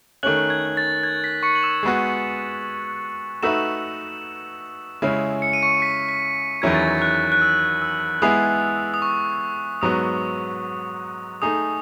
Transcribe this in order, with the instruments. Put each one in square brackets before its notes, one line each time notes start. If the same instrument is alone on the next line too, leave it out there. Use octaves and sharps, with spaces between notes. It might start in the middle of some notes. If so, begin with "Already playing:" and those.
[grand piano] D#3 A3 C#4 [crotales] F#6 F#7
[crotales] G#6
G#6
A6
G#6
B6
C#6 C#7
F#7
E6 E7
[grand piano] G#3 B3 F#4
[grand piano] A3 D#4 F#4 B4 E5 [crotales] E6 E7
[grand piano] C#3 G#3 C#4 E4
[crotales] C#7
D#7
C#6 C#7
B6
B6
[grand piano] E2 D#3 F#3 C#4 E4 [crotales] G#6
[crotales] A6
G#6
F#6
F#6
E6
E6
[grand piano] G#3 B3 E4 G#4 [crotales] D#6
[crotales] D#6
C#6
[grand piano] G#2 F#3 B3 F#4 [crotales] D#6
[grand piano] A3 D#4 G#4 [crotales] D#6